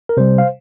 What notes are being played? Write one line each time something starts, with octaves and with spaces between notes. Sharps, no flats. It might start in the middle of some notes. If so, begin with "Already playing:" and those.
A#4
C3 G3 C5
F5